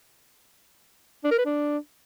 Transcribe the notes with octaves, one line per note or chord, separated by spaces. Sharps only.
D4
A#4
B4
D4